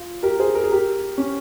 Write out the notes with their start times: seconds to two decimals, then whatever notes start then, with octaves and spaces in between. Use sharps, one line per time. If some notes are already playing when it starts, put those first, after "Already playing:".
Already playing: F4
0.23 G4 A#4
0.39 G#4 C5
0.55 A#4
0.63 G#4
0.72 G4 A#4
1.18 C#4